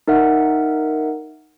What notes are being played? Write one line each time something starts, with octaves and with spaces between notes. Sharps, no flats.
D#4 A#4 E5 F#5